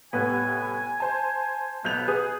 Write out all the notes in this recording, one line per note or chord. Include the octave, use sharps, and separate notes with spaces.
C2 A2 B3 G#5
C5 A5
B1 B3 G6 F7
G#4 B4 D#6